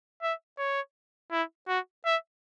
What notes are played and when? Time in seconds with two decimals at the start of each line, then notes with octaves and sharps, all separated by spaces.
0.22 E5
0.58 C#5
1.32 E4
1.68 F#4
2.05 E5